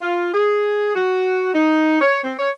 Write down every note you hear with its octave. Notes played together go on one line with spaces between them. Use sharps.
F4
G#4
F#4
D#4
C#5
C4
C#5